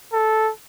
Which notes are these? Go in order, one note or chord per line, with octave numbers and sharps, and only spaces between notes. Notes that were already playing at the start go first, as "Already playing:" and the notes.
A4